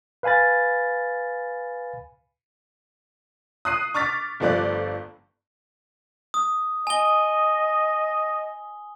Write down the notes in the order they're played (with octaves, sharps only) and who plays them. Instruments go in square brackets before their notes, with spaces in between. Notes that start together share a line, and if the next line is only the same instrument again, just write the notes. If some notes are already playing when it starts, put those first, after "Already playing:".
[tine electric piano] B4 F5 G#5 B5 A6
[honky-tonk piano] D#6 F#6 C7 D#7
C#6 D6 F6 A6 B6
G1 G2 F3 A3 D5 F#6
[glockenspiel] D#6
[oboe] D#5 [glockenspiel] G#5 G7